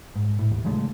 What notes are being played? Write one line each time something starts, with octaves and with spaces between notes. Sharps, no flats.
G#2
A2
D#2
C#3 F3 G#3 A3